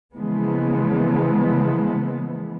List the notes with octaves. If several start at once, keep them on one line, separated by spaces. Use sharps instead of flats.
C#3 E3 F3 G#3 A#3 B3